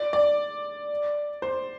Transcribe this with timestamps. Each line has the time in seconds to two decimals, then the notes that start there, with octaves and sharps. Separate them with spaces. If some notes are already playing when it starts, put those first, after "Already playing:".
Already playing: D5
0.13 D5
1.42 C5